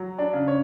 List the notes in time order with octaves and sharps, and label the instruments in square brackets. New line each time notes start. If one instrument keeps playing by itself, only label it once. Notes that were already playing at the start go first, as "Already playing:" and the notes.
Already playing: [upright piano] F#3
D4 D5
C#3
C#5